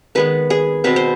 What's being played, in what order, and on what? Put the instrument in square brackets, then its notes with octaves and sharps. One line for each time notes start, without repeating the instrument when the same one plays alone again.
[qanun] D#3 G#3 B3 B4
G#4
B2 G#3 C4 B4
C5